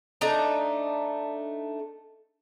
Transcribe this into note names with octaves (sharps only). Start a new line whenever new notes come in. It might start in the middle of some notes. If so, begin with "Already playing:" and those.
A3 D4 D#4 A#5